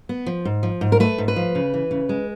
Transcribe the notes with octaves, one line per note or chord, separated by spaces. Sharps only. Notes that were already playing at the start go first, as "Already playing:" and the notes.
B3
F3
G#2
F3
G#2
A#4
A3 B4
G#2
B4
F3
C#3
E3
C#3
G#3